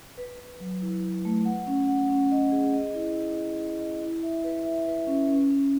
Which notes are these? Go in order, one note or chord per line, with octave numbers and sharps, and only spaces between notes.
B4
B4
F#3
E4
B4
A3
F#5
C#4
F#5
C#4
D#5
G#4
D#5
E4
E4
D#5
E4
D#5
E4
E5
B4
E5
B4
C#4
C#4
C#4